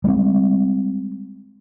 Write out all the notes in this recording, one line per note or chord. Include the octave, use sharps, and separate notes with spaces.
G3 G#3 B3 C4